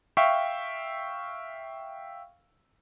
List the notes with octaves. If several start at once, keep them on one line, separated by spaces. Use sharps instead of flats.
E5 F5 G5 C#6